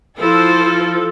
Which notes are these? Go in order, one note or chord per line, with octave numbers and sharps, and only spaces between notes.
F3 E4 A4 C5